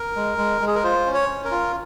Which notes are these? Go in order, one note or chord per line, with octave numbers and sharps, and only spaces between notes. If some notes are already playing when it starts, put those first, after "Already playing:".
Already playing: A#4
G#3
G#3
G#3
G#4
A#4
F4 C5
C#4
C#5
C#4
A#4
F4